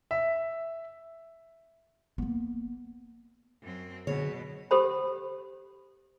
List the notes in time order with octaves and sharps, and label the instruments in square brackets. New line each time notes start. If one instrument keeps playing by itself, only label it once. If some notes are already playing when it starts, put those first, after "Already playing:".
[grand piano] E5
[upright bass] A#3 B3
[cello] F#2 C4
[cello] B2 [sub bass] D3 [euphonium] G#4 [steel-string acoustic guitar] C#5
[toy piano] G4 A4 C5 B5